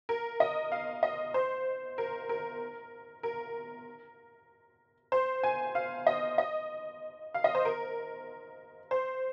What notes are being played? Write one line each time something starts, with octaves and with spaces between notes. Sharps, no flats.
A#4
D#5
F5
D#5
C5
A#4
A#4
A#4
C5
G#5
F5
D#5
D#5
F5
D#5
C5
A#4
C5